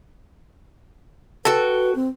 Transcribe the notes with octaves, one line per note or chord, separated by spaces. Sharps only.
F#4 A4 B4 G5
C4